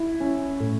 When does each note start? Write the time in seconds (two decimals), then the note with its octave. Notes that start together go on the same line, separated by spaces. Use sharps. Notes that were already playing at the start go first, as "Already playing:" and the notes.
Already playing: E4
0.20 C#4
0.60 A2